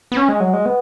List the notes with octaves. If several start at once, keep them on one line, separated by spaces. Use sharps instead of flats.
B3
C#4
G#3
F#3
G#3
B3